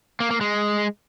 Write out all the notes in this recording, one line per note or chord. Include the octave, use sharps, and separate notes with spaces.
A#3
A#3
G#3